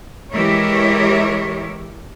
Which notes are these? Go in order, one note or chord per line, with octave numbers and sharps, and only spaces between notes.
E3 G#3 G4 A#4 C#5 E5